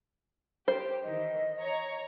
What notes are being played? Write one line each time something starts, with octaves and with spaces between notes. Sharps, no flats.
G4 C5
D#3 E3 D#5
C#5 A#5 C#6